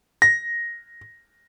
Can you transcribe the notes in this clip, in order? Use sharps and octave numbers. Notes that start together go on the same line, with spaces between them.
A#6